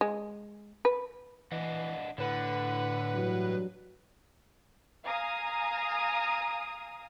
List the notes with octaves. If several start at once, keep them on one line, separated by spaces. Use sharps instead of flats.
G#3
B4
E3 D4 D#5 F#5
A2 D3 B4 F#5 B5
G2 E3 F#3
F5 G#5 A#5 D#6